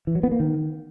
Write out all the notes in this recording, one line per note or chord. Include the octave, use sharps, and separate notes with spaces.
E3
F#3
B3
A#3
D#3